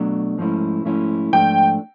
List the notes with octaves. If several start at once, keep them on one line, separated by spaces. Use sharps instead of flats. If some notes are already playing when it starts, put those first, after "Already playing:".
Already playing: B2 F#3 A3 D4
G#2 F3 A3 C#4 E4
G#2 F3 A3 C#4 E4
G#2 F3 A3 D4 G5